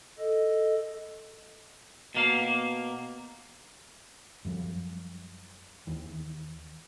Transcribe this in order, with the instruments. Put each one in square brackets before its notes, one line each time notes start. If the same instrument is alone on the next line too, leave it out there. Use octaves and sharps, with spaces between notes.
[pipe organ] A4 D#5
[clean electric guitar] B2 A#3 F5
[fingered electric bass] F#2 F3 G3
D#2 D#3 E3